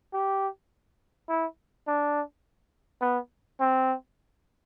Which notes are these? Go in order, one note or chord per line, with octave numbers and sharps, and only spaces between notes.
G4
E4
D4
B3
C4